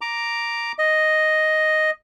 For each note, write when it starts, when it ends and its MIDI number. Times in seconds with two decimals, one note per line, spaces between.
0.01 0.72 82
0.01 0.72 86
0.79 1.90 75